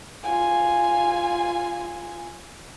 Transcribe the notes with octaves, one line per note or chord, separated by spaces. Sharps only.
F4 G#5